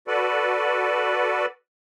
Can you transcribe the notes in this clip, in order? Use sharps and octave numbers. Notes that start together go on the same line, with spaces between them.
F#4 A4 B4 D5